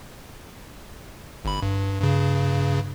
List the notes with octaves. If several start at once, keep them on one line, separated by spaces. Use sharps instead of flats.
G1 B5
G2
G2 C#3